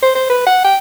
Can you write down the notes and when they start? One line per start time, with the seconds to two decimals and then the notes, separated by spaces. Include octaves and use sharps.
0.03 C5
0.15 C5
0.30 B4
0.47 F#5
0.65 G5